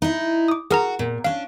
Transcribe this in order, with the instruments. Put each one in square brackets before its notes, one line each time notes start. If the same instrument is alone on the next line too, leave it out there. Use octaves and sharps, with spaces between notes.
[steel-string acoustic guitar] D#4 E4
[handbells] D6 D#6
[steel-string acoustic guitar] F#4 [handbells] G#4 A#4 A#5
[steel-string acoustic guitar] A#2
[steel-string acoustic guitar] C#4 D4 [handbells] F5